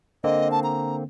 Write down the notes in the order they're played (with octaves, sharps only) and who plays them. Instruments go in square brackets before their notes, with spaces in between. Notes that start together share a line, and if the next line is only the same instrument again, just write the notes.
[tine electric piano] D3 A#3 C4 [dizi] D#5
[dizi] A5
A#5